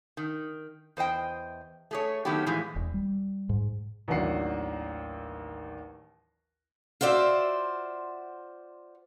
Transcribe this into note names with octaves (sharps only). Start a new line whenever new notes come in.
D#3
E2 C5 D#5 G5
A3 G#4 C#5
D#3 F#3 A3 B3 G4
A2 E3 F3 G#3 A3
E1
G3
G#2
A1 D#2 F#3 D4 F#5 C7
F4 F#4 C5 D5 E5